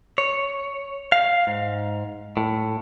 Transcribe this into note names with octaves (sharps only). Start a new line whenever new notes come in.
C#5
F5
G#2
A2